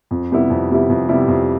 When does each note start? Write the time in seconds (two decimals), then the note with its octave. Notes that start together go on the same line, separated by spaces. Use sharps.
0.11 F2
0.31 C3 G3 B3 E4
0.50 F2
0.71 C3 G3 B3 E4
0.90 F2
1.09 C3 G3 B3 E4
1.28 F2